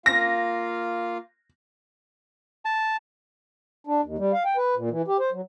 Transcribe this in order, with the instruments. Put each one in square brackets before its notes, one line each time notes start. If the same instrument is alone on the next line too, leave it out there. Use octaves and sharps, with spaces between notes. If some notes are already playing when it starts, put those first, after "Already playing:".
[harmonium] A#3 F4 F5 [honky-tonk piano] A#6
[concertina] A5
[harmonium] D4
D#2
G3
F5
G5
B4
A#2
E3
G4
C5
F#3